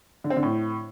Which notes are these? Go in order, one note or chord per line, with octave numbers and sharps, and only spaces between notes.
D3
C4
D3
A2